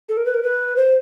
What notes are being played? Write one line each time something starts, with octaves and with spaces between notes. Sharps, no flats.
A4
A#4
B4
A#4
B4
C5